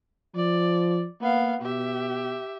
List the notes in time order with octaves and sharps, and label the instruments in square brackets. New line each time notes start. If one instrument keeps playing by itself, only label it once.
[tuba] F3 [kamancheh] D5
[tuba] A#3 [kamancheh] B3 F5
[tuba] B2 [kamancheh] G4 E5